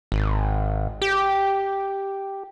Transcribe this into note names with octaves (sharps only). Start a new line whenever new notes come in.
G#1
G4